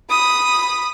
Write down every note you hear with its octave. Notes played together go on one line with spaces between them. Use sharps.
B5 D#6